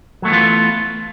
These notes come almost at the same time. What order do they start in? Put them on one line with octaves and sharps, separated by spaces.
F#3 A3 B3 E3 F4